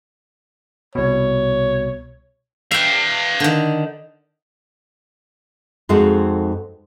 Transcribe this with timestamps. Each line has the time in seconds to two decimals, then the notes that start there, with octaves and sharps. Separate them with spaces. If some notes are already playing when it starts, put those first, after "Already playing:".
0.95 C2 B2 C#5
2.71 B4 E5 F5 G5
3.40 D3 D#3
5.89 F2 G#3 C4 D#4 F#4 A4